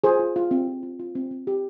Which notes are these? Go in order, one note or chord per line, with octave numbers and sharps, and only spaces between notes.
F4 G#4 C5
F4
F4
C4
F4
F4
F4
C4
C4
G4